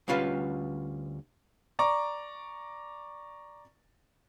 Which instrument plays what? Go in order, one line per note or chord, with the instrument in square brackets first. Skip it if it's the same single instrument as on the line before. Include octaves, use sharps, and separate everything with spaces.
[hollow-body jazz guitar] D2 G3 C#4 F4 B4 F5
[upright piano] D5 A#5 C#6 D6